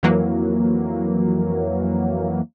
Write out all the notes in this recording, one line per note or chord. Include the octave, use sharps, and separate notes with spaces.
F2 E3 F#3 A#3